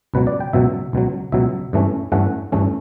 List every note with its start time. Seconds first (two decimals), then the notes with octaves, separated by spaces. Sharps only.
0.14 C#2 B2 F#3 B4
0.27 D5
0.40 G5
0.53 C#2 B2 F#3 E5
0.93 C#2 B2 F#3
1.32 C#2 B2 F#3 E5
1.73 G2 E3 A3 C#4
2.12 G2 E3 A3 C#4 F#5
2.52 G2 E3 A3 C#4